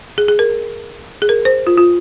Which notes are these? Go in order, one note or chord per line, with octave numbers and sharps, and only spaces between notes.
G#4
G#4
A#4
G#4
A#4
C5
F4
F4